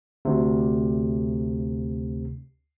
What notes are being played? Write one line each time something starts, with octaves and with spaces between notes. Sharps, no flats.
D2 C3